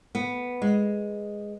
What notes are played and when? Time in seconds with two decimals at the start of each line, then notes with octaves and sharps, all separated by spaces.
0.15 B3
0.62 G#3